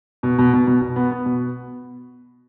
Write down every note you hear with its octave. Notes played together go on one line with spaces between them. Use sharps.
B2
B2
B2
B2
B2
B3
B3
B2